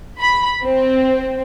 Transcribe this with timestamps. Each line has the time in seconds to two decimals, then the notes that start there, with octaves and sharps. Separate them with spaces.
0.20 B5
0.64 C4